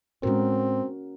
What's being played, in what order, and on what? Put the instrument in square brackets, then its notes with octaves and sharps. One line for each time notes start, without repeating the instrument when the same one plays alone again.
[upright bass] A2 G#3 [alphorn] C4 [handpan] C#4 F#4 A#4